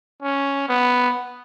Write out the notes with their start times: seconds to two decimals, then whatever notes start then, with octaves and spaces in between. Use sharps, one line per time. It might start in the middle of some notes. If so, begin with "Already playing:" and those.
0.22 C#4
0.69 B3